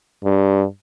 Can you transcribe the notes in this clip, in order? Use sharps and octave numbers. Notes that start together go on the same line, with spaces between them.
G2